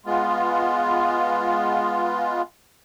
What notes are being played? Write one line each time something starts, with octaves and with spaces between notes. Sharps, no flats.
G#3 B3 F4